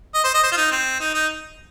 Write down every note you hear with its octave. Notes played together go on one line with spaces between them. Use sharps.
D#5
C5
D#5
C5
F4
D#4
C4
D#4
D#4